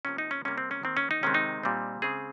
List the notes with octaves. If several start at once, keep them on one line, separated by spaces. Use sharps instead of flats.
C3 F3 A#3 C#4
D#4
C#4
C3 G3 A#3 C#4
C4
C#4
D#3 A#3 C4
C#4
D#4
C3 D#3 G#3 C4 C#4
D#4
A#2 G3 C4
C#3 G#3 C4 G#4